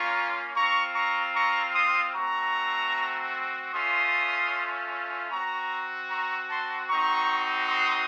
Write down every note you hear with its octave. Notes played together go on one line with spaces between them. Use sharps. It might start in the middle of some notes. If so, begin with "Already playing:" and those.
Already playing: A#3 C#4 F4 A#5 C#6
C4 F4 A#5 C#6
A#5 C#6
A#5 C#6
C6 D#6
A3 C4 F#4 A#5 C#6
A3 C#4 F4 C6 D#6
C4 F#4 A#5 C#6
A#5 C#6
A5 C6
C4 D#4 F#4 A#5 C#6
C6 D#6